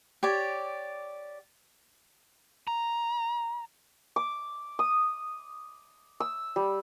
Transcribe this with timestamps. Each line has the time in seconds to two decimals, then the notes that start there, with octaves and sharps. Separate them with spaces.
0.23 G4 C#5 D5
2.67 A#5
4.16 D6
4.79 D#6
6.20 E6
6.56 G3